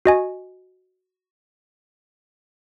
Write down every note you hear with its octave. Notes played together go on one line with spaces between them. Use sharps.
F#4 D#5 G#5